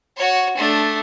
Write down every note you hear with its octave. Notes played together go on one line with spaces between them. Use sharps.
F#4 C#5
A3 D4